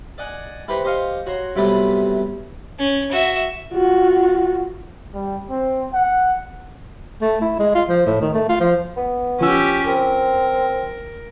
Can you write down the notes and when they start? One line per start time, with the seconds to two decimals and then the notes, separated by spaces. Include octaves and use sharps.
0.18 D5 D#5 F#5 G#5
0.68 E4 G4 B4 C5 A#5 C#6
0.84 G4 C5 D#5 F5 C6 C#6
1.26 F#4 C#5 A#5 C6
1.55 C3 F#3 G3 A3 B3
2.79 C#4
3.12 F#4 E5
3.73 F4 F#4
5.14 G3
5.50 C4
5.93 F#5
7.21 A3
7.42 E4
7.59 G#3
7.75 F4
7.89 F3
8.06 A2
8.21 D#3
8.34 A3
8.49 F4
8.60 F3
8.97 B3
9.40 F3 C#4 G4 E6
9.87 C4 A#4